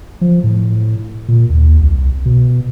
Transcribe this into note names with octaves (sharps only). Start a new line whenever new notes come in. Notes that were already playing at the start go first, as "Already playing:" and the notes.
F3
A2
A#2
D#2
C2
B2